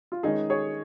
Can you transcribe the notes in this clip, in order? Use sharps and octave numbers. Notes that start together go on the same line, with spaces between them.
F4
D#3 G#3 C#4 D#4 G#4
G#4 C#5